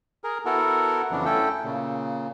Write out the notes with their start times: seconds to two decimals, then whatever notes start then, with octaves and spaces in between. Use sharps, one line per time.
0.24 G#4 A#4
0.45 B3 E4 F#4 A4 A#4
1.11 F2 C#3 E3 F#3 B3 D4
1.25 A3 C#4 E4 A4 G5
1.64 A#2 C#3